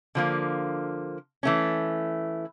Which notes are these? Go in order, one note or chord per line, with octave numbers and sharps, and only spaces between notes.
D3 F3 A#3
E3 A3 C#4